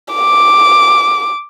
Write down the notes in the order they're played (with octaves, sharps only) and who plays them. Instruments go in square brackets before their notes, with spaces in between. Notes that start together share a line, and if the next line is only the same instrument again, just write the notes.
[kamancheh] D6